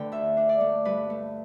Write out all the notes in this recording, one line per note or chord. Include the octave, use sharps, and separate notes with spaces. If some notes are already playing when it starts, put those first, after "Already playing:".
Already playing: D3 A3 D4 A4 B4 G5
D2 E5
D4
D5
A3
G2 B4
A3